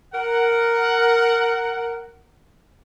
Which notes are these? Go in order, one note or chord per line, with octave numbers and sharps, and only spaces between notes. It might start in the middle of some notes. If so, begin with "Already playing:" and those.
A#4 F#5